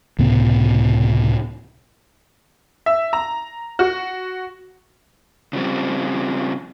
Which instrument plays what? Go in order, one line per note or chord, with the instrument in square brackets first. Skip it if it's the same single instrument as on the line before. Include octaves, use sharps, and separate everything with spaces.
[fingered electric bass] C#2 A2 C3 B3
[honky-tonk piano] E5
A#5
F#4
[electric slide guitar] C#3 F3 G3 C4